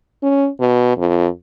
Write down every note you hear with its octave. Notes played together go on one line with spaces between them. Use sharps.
C#4
B2
F2